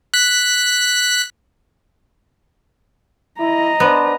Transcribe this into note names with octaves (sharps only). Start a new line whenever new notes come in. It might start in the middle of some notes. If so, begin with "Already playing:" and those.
F#6 B6
E4 D#5 A#5
B3 D4 C5